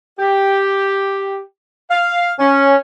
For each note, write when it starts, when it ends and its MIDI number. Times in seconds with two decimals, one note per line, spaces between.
0.19 1.38 67
1.90 2.31 77
2.39 2.75 61